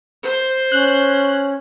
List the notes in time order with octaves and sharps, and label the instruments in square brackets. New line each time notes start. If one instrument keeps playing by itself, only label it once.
[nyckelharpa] C5
[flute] C#4 [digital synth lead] F#6